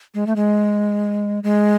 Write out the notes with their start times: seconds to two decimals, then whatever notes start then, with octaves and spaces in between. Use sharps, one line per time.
0.14 G#3
0.27 A3
0.36 G#3
1.44 G#3